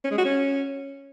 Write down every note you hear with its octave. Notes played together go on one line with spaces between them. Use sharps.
C#4
G#3
F#4
C#4